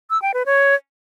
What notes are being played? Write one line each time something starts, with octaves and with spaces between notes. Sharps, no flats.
E6
G5
B4
C#5